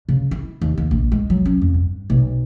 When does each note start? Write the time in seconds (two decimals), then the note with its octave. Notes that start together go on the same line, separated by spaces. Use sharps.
0.09 C#3
0.31 E4
0.61 D#2
0.78 D#2
0.91 A#1
1.12 G#3
1.30 F#3
1.46 C#4
1.62 F2
1.74 G2
2.10 B1